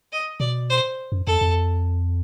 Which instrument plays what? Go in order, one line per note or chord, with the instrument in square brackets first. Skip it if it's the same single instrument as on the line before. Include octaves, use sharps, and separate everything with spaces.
[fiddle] D#5
[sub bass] B2 [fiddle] D5
[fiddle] C5
[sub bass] F#2
[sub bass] F2 [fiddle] A4
[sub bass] F2